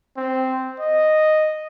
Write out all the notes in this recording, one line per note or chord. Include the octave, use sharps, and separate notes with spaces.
C4
D#5